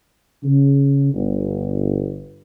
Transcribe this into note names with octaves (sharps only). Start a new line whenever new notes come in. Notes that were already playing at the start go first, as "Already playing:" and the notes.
C#3
G1